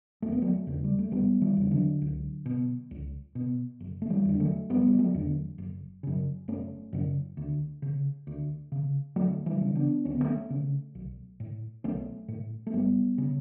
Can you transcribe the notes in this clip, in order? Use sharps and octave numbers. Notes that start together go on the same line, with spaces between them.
E1 A3
B3
F#3 A3
E2 C#3
G3
A3
E1 G3 B3
E3 G3
E2 C#3
D3 F#3
C#2
B2
C#2
B2
F#1
A3
E3 G3
E2 D3
F#3 A3
F#1 G3 B3
G3
F#3 A3
E2 D3
F#1
F#2 C#3
F#1 A3 C#4
F#2 C#3
D2
C#3
D2
C#3
D2 F#3 A3
E3 G3
C#3
B3 D4
D2 C#4
B3
A3 C#4
C#3
B1
A2
B1 A3 C#4
A2
A3
F#1 G3 B3
C#3